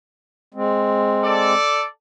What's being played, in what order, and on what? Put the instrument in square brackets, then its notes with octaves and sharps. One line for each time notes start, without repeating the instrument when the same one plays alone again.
[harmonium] G#3 C4
[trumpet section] A4 D5